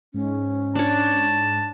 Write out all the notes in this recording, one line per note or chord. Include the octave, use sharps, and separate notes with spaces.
G#2 C#4
D4 C#5 A5